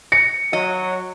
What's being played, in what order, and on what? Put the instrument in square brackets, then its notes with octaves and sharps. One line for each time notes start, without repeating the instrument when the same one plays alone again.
[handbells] A#6 [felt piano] C#7
[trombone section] F#3 [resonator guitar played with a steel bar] D#5